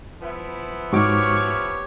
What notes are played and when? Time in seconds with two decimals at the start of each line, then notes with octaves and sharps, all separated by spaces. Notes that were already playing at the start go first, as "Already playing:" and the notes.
0.21 F3 B3 E4
0.93 G#2 F#4 G4 C#5 C#6 D6 F6